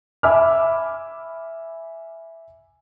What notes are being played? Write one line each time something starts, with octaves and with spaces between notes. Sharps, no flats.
E5 G#5 B5 D6 E6 F6